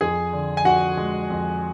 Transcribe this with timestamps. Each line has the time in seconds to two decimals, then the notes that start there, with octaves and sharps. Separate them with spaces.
0.01 F2 G#4 G#5
0.33 D3
0.57 G#5
0.65 F2 F#4 F#5
0.97 G#3
1.30 F2